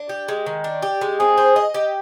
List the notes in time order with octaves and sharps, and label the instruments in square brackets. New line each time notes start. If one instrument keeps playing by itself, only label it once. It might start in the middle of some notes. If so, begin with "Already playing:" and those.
Already playing: [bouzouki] D4
G4
G#3
D#3
D4
G4
G#3
[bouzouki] C4 [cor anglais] G#4
[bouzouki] C5
D#5
G4